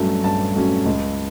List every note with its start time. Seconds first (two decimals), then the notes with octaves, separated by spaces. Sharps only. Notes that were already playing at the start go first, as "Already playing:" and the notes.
Already playing: G2 F#3 A3 C#4
0.24 G2 A5
0.56 F#3 A3 C#4
0.86 C#2